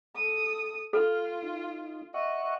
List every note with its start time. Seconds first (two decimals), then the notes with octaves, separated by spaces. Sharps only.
0.16 A4 D#6
0.93 F4 A4 F6
1.42 D#4
2.14 D#5 E5 F#5 C#6